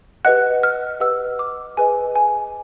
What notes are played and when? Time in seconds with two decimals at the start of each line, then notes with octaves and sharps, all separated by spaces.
0.25 G4 B4 D#5 F#5 F#6
0.63 F6
1.00 G4 B4 D#5 F#5 E6
1.39 D6
1.77 G#4 B4 D#5 G#5
2.16 G#5